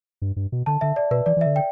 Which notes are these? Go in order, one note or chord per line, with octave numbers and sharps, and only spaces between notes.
G2
G2
B2
D3 A5
D3 E5
D5
B2 B4
E3 D5
E3
E5
D3
G5